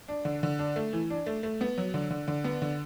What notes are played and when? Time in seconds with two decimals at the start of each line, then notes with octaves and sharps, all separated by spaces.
0.08 D4
0.25 D3
0.43 D3
0.59 D4
0.76 A3
0.93 E3
1.10 D4
1.26 A3
1.43 A3
1.61 B3
1.78 F#3
1.94 D3
2.11 D3
2.28 D3
2.44 B3
2.62 D3